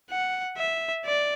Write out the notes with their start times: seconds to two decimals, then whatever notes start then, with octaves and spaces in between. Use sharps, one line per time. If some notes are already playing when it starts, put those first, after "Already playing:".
0.10 F#5
0.57 E5
1.06 D5